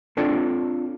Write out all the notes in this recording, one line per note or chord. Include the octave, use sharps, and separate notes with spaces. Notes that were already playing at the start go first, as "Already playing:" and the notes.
C4 D4 F4 A4 C#5 D5